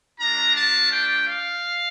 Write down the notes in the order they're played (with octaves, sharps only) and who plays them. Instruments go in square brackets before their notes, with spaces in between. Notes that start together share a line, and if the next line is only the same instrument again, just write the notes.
[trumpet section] A3 D4 F4 A#5
A5
G5
F5